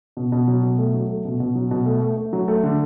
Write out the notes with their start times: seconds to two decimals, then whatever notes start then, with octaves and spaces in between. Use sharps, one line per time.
0.17 B2
0.32 B2
0.48 F#3
0.63 B2
0.78 A3
0.94 F#3
1.09 A3
1.25 B2
1.40 B2
1.55 F#3
1.71 B2
1.86 A3
2.02 A3
2.17 A3
2.33 F#3
2.48 A3
2.63 D3